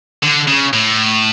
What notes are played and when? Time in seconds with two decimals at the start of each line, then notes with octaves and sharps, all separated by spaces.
0.23 D3
0.48 C#3
0.73 A2